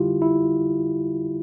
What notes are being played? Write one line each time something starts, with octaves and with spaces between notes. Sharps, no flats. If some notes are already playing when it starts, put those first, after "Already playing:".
Already playing: F2 D3 G3 E4 F4 G4
E4